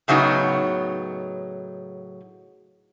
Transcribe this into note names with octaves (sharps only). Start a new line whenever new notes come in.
A2 C#3 F#3 B3 D#4